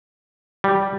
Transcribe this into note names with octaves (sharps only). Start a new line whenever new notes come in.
G3